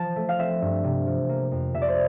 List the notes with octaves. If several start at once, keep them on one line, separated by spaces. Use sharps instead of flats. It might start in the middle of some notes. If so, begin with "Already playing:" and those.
Already playing: F3 A5
A3
F5
C4 E5
G2
C3
F3
A#3
F2
C3 E5
D5
C5